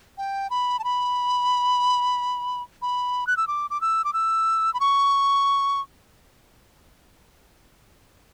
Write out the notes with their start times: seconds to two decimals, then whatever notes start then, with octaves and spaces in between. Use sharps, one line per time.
0.18 G5
0.50 B5
0.79 A5
0.84 B5
2.82 B5
3.27 F#6
3.37 E6
3.47 D6
3.70 D6
3.81 E6
4.04 D6
4.13 E6
4.74 B5
4.80 C#6